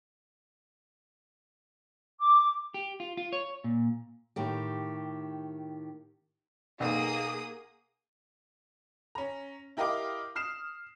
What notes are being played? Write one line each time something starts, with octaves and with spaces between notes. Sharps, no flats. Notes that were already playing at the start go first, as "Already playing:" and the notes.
D6
G4
F4
F4
C#5
A#2
A2 D#3 G4
B1 A#3 G#4 D#6
C#4 A#5
E4 G4 A#4 D#5 F5 D6
D#6 F6 C7 E7